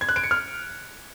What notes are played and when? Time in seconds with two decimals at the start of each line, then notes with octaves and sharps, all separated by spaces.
0.01 G#6
0.09 F#6
0.16 D7
0.23 C#7
0.31 F6